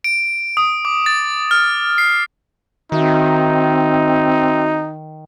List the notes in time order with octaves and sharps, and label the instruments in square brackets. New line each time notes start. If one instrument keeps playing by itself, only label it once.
[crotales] D7
D#6
D6
A6
F6
C7
[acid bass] D#3 [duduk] C4 [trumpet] D#4 [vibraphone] F#4 E5